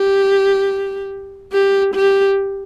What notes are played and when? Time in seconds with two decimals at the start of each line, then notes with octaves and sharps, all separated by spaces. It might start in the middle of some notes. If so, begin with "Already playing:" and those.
Already playing: G4
1.52 G4
1.94 G4